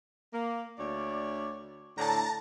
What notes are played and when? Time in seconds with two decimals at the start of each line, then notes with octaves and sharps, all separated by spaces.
0.34 A#3
0.78 D2 C#5 D5
1.98 A2 D3 A5 A#5